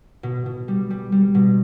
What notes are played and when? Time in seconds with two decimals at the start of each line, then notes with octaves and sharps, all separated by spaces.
0.23 B2
0.46 B2
0.68 G3
0.90 G3
1.12 G3
1.35 B2